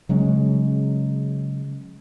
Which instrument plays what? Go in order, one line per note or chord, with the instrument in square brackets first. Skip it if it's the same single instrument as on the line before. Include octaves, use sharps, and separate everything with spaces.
[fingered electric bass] C#3 F#3 G#3 C#4